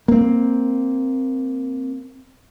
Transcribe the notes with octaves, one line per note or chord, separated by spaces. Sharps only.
A#3 C4